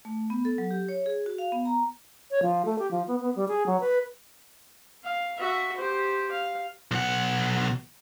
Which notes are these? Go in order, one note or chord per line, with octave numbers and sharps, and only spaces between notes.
A3
B3
A4
F#3
G4
C#5
G#4
F#4
F5
B3
A#5
C#5
F3
A3
G4
F3
B3
B3
G3
G#4
F#3
B4
F5
F#4 E5
G4 C5
F5
B1 F#5